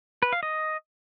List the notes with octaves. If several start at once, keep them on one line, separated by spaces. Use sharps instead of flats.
B4
F5
D#5